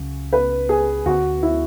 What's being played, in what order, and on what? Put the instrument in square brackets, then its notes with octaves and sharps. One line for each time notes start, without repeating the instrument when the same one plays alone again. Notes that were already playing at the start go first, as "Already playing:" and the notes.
Already playing: [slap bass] C#2 C#3 F#3 C#4
[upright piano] B4
G#4
[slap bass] D2 D3 F#3 B3 [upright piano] F#4
[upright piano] E4